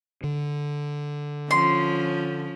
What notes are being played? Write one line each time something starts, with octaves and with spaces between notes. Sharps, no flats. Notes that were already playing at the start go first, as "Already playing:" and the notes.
D3
F3 C#4 C6